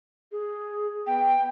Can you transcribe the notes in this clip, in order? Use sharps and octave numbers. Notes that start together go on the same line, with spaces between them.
G#4
B3 G5